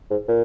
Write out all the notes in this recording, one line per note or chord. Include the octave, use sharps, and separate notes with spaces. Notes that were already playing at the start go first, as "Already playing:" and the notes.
G#2
A#2